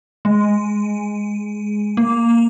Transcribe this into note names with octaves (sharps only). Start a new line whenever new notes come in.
G#3
A#3